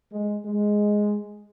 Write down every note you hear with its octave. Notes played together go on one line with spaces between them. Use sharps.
G#3
G#3